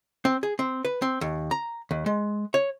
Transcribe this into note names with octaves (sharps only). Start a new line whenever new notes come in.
C4
G#4
C4
B4
C4
D#2
A#5
D#2
G#3
C#5